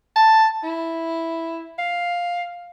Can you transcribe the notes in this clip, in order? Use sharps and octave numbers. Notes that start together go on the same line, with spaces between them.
A5
E4
F5